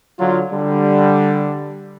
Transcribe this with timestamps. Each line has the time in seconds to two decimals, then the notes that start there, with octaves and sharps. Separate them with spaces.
0.19 D3 F#3 F4
0.53 D3 G3